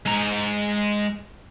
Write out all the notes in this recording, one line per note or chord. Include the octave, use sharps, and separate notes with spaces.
G#3 A#5